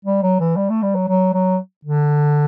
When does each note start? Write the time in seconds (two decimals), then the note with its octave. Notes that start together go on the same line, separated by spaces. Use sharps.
0.05 G3
0.23 F#3
0.40 E3
0.57 G3
0.70 A3
0.82 G3
0.95 F#3
1.08 F#3
1.34 F#3
1.85 D3